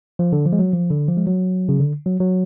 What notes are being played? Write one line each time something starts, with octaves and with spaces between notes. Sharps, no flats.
F3
D3
F3
G#3
F#3
F3
D3
F3
G#3
F#3
C#3
D3
F#3
F#3